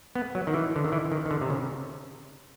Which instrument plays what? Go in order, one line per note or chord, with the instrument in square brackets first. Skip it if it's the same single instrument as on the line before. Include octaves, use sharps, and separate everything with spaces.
[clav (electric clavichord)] B3
F#3
D#3
E3
D3
D#3
E3
D#3
D#3
D3
C3
C#3